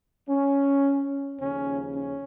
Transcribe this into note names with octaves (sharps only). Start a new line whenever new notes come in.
C#4
D#2 C#3 F3 C#4
C#4